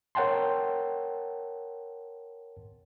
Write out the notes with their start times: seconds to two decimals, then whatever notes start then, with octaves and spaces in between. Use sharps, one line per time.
0.15 A#4 C#5 F#5 G5 A5 C6